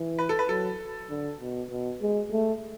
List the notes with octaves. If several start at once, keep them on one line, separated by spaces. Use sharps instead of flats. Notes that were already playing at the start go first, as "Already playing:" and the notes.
Already playing: E3
B4
A4
B4
F#3 A4
D3
B2
B2
G#3
A3